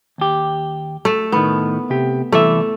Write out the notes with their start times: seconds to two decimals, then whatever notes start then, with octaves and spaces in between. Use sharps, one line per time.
0.18 D#2 G4
1.05 A3
1.32 A2 D#3 B3
1.90 C3 G4
2.32 C2 E3 A3 E5